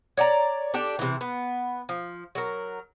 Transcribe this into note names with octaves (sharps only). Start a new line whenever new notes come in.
C#5 D5 G5 A#5
D4 G4 A4 D5
C3 E3
B3
F3
F#3 A#4